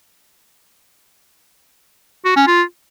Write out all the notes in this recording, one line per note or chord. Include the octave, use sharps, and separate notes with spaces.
F#4
C#4
F4